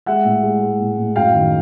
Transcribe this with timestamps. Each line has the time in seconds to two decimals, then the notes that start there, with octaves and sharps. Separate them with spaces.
0.06 G#3 E5 F#5
0.25 A2
0.43 G#3
0.62 G#3
0.80 A2
0.97 A2
1.16 F#2 F5 G5
1.34 D#3